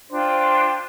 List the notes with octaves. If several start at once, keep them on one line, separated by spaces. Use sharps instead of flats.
D4 F4 C5 G5